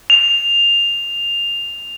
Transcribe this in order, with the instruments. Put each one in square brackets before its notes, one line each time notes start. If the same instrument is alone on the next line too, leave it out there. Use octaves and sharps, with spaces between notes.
[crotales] F7